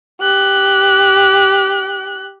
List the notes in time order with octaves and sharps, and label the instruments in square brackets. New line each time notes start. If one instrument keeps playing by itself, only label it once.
[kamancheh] G4 F#6